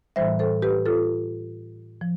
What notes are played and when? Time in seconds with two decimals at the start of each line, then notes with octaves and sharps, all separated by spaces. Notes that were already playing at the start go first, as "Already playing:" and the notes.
0.16 A2 E3 G3 C5 E5
0.39 A4 C5
0.62 G4 B4
0.86 F4 A4
2.01 F3